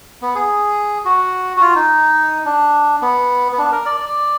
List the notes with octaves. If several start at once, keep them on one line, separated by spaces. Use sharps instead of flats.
B3
G#4
F#4
F#4
F4
D#4
D4
B3
B3
D4
A#4
D5
D5